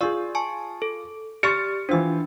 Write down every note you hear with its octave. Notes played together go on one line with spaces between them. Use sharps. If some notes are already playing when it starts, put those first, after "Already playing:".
F4 G#4 D5 C#6 E6
G#5 A5 C#6
A4
G4 D5 C#6 F6 A6 C#7
E3 D4 F4 C5 E6